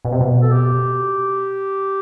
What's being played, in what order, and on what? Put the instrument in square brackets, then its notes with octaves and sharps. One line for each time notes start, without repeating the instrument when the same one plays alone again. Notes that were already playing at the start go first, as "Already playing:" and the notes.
[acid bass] B2
C3
B2
[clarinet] A4
G4